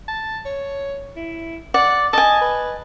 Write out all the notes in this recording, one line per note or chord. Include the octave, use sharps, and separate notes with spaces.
A5
C#5
E4
D5 F#5
D#5 G#5 A5
B4